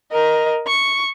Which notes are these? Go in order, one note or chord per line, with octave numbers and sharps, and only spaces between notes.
A#4 D#5
C#6